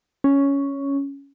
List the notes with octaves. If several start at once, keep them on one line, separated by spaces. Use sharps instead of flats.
C#4